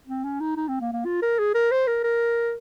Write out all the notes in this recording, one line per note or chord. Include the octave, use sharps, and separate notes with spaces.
C4
C#4
D#4
D#4
C4
A#3
A#3
F4
A#4
G#4
A#4
C5
A#4
A#4